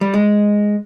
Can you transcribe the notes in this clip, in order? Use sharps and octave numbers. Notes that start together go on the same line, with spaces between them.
G3
G#3